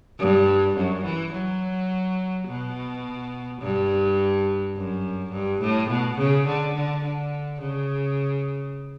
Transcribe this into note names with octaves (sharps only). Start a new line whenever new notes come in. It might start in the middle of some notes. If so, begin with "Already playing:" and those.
G2
F#2
E3
F#3
B2
G2
F#2
G2
A2
B2
C#3
D3
D3
D3
C#3